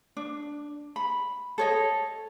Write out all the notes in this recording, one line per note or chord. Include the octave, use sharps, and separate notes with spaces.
D4
B5
A4 C#5 D#5